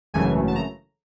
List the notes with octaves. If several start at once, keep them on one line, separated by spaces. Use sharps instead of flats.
G#1 F#2 C#3 E3 A3 G#5
A5
A#5